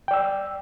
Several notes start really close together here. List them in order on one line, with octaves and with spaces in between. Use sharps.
G5 D5 E6